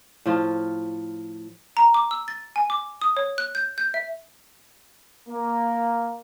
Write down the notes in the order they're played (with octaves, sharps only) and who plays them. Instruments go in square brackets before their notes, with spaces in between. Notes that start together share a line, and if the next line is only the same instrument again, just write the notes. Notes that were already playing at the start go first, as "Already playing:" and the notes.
[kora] A2 F3 F4
[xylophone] A#5
D6
E6
A6
G#5
D6
D#6
C#5
F#6
G6
G6
E5
[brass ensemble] A#3